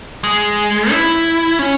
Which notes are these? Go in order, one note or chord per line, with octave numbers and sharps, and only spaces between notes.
G#3
E4
C#4